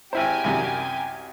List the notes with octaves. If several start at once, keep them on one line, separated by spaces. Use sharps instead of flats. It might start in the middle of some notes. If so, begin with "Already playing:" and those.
G#1 E4 G4 C5 G#5
C2 F#2 C3